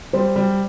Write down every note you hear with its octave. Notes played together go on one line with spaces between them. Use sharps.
G3 C5
G3